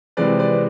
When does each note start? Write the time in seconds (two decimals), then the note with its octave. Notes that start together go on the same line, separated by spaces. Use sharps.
0.17 C3 E3 G#3 B4 D5
0.39 B4 D5